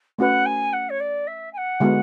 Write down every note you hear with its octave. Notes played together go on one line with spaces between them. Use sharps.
A3 C#4 F#4 B4 F#5
G#5
F#5
C#5
D5
E5
G#5
F#5
D3 G#3 B3 F#4